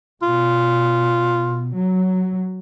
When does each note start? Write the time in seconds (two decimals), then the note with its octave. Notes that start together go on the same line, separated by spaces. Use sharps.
0.22 B2 F4
1.74 F#3